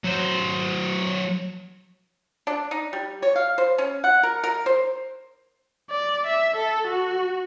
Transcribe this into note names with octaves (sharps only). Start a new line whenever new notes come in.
F#3 C5
D4
D#4
G3
C#5
F5
C5
C#4
F#5
A#4
A#4
C5
D5
E5
A4
F#4